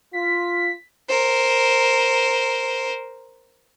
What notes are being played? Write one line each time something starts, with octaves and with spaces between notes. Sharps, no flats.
F4 B6
A#4 C5